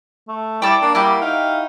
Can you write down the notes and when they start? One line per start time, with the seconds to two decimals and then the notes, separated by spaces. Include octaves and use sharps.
0.28 A3
0.62 G3 E4 G5 A5 D6
0.82 A#3 D4
0.95 G3 E4 F#4 G4
1.22 D#4 F5